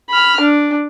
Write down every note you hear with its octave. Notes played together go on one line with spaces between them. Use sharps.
B5 F6
D4